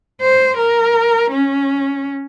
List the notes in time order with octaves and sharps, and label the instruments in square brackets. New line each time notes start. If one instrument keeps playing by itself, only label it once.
[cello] C5
A#4
C#4